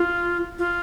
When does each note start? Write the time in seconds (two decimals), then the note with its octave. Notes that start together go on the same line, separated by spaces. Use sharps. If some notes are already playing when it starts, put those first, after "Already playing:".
Already playing: F4
0.59 F4